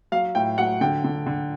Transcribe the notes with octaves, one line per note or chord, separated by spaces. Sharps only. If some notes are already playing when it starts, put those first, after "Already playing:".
F#3 F5
A2 G5
F#3 F#5
D3 G5
D3
D3